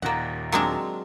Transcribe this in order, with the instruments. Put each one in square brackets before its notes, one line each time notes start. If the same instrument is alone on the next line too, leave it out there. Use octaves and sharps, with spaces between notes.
[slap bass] D#2 A#2 [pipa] A#3 F#5
[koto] F#3 G#3 C4 [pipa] D4 A#4